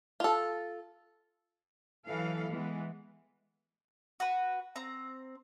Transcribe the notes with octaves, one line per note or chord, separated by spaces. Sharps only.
F4 A4
E3 F#3 E4 A4 F5
E3 G#3 B3
F#4 B4
C4 A#5